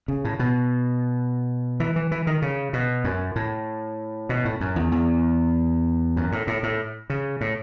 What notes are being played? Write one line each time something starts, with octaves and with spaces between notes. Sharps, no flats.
C#3
A2
B2
E3
E3
E3
D#3
C#3
B2
F#2
A2
B2
A2
F#2
E2
E2
F#2
A2
A2
A2
C#3
A2